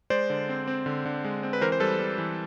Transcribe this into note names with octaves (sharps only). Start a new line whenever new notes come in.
G#3 C5 D5
D3
C4
C4
D3
D3
G#3
C4
B4
E3 A#4 C5
C5
G3 A4 B4
G3
E3